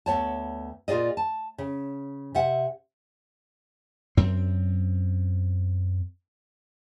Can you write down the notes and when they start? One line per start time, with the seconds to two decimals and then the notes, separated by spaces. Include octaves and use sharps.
0.06 D2 B3 C#5 A5
0.88 A#2 F4 G#4 D5 D#5
1.17 A5
1.58 C#3
2.34 C3 E5 F#5
4.17 F#2 C4